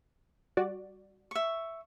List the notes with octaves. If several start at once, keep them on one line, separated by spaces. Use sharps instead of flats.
G3 F#4 D5
E5 C#6